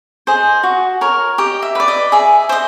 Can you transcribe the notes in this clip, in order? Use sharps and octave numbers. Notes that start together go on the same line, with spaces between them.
G#4 C5 D#5
F#4
A#4 C#5
G4 D#5
E5
B4 D5
D#5
G#4 E5
C5 D#5